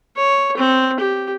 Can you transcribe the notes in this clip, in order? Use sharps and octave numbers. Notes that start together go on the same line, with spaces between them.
C#5
C4
G4